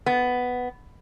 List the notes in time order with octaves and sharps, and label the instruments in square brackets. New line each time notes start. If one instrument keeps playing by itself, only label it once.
[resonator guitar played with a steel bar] B3